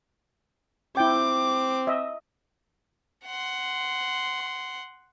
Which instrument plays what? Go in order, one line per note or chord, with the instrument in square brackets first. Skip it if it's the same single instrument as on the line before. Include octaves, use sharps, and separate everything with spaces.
[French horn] C4 [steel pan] E4 G5 [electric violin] D6
[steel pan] D#5 E5
[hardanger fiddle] F#5 C6